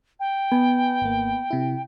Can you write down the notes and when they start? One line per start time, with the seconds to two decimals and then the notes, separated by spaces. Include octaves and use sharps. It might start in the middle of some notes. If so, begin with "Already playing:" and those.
0.20 G5
0.52 B3 G#5
1.02 G#1 A#3
1.51 C3 E4